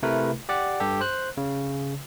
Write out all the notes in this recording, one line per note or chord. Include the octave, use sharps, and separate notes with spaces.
C3 A3 E4 A#4 B4
G4 D5 F#5
G2 G4 A4
C5 F#6
C#3